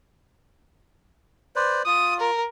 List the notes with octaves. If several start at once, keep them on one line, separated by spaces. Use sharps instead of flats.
B4 C5 D5
F4 D#6
A#4